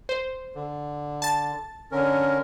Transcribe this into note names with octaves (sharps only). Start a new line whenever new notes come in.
C5
D3
A5 A6
D3 C#4 A#4